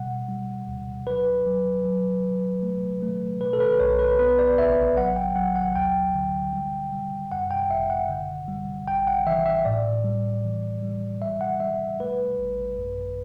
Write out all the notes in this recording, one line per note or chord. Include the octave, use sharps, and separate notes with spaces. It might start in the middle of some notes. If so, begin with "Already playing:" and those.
Already playing: B2 G3 F#5
G3
D2
F#3 B4
F#3
F#3
F#3
A3
A3
B2 B4
A4
B4
B1 C#5
B4
B3 B4
D5
A1 E5
F#3 F#5
G5
F#3 F#5
F#5
D2 G5
D3
G3
G3
F#2 F#5
G5
G1 E5
F#5
D3
G3
A1 G5
F#5
E3 E5
E5
A2 D5
G3
E3
G3
G3 E5
F#5
G3 E5
A3 B4
A1
F#2